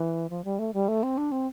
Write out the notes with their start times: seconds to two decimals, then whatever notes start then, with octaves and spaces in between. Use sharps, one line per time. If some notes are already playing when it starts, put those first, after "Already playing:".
Already playing: E3
0.30 F3
0.44 G3
0.59 A3
0.74 G3
0.88 A3
1.03 C4
1.18 D4
1.32 C4